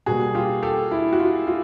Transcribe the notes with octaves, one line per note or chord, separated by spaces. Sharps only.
B2 G3 A#3 F#4 G#4
F4 G4
G4 A4
E4
F#4
F4
F4